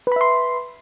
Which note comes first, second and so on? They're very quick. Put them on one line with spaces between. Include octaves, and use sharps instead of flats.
B4 B5 E5 C6